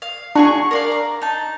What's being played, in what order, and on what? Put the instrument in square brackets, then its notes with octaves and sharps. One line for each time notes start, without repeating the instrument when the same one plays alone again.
[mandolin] F5
[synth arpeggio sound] D4 [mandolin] F#4 G#4 C#6
[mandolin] A#4 D5 F5
A#5
D#4 A5